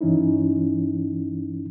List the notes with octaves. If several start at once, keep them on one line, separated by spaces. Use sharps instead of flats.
G2 E3 C#4 D#4 E4